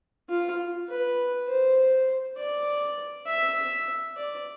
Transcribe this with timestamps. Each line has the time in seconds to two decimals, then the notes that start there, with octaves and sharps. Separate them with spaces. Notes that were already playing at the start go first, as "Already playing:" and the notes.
0.29 F4
0.89 B4
1.48 C5
2.38 D5
3.28 E5
4.17 D5